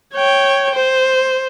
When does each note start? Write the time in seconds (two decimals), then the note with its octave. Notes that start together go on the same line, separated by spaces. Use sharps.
0.15 C#5 G5
0.75 C5